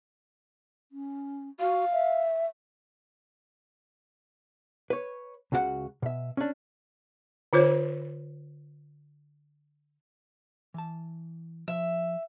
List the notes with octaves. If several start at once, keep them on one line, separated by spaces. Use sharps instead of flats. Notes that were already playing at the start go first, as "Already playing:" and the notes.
C#4
F#4 F5
E5
B4 C#5
C#2 C#3 F#4 G#4 F#5
B2 E5
C#4 D4
D3 F4 C5 C#5
E3 A5
F3 E5